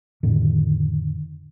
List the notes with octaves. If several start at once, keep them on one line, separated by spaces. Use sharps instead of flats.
F2 A2 D3 D#3